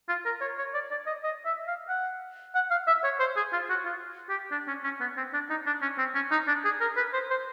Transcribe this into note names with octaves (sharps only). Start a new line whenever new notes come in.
F4
A#4
C#5
C#5
D5
D5
D#5
D#5
E5
F5
F#5
F#5
F5
E5
C#5
C5
G#4
F4
F#4
F4
G4
D4
C#4
C#4
B3
C4
D4
D#4
D4
C#4
C4
C#4
D#4
D4
G#4
A#4
B4
C5
C5